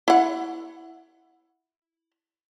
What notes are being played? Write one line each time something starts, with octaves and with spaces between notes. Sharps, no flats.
E4 F#5